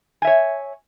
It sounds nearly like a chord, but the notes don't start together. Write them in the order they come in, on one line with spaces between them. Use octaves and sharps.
G#5 E5 C#5